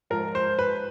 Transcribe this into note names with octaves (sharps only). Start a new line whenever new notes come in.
G#2 F3 A#4
C5
B4